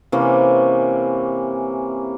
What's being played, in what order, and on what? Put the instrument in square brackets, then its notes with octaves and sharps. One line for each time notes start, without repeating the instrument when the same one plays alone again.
[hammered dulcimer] C3 E3 A#3 C#4